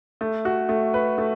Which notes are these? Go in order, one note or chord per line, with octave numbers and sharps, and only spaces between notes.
A3
F#4
A3
B4
A3